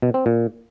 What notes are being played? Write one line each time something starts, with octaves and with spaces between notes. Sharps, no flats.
B2
C4
A#2